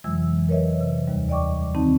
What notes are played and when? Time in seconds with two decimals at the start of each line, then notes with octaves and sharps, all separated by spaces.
0.04 F2 C3 E3 F#3 G#3 E6
0.49 A#4 B4 C#5 D#5 E5
0.80 C3
1.08 D#2 G3
1.29 D5 D#5 G5 C#6 D6
1.75 D#3 C4 D#4 A5